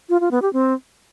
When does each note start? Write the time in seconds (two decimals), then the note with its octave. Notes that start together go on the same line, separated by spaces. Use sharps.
0.09 F4
0.20 F4
0.31 B3
0.42 G4
0.53 C4